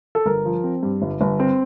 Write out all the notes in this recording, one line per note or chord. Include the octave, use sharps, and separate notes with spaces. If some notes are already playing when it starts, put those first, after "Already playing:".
A4
G1 A#4
F3
C4
G2
G1
G1
C4